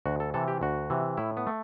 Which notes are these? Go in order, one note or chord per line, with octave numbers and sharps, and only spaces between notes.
D2 F#4
A4
C3 E3 A4
G4
D2 F#4
C3 E3
A2 E4
B3
A3